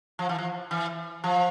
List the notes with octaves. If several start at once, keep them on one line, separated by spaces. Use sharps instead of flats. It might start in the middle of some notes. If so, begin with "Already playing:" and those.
F3
E3
F3
E3
F3